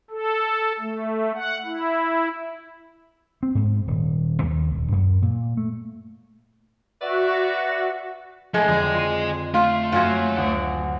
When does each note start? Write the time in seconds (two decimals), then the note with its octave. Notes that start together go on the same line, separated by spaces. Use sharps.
0.10 A4
0.79 A3
1.34 F#5
1.66 E4
3.43 C4
3.55 G#2
3.87 D#1
4.43 D#2
4.74 D#1
4.92 F#2
5.22 A#2
5.57 A3
7.01 F#4 B4 D5 E5
8.54 A2 F3 G#3
8.68 F2 D3 G#4 D#5
8.94 F4 C6 D#7
9.54 A3 F4
9.92 F#2 F#3 C#4 F4
10.36 D2 F#5 D7